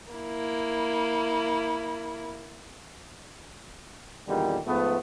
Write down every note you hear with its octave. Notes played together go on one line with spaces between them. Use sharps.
A#3 E4
E2 A#2 D3 D#3 G3
G#2 F3 A3 B3